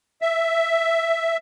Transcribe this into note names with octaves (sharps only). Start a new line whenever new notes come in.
E5